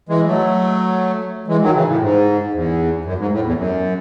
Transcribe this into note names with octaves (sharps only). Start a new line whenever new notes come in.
E3 G#3
F#3 A3
E3 G#3
D#3 F#3
C#3 E3
A2
G#2
E2
F#2
G#2
A2
E2
F#2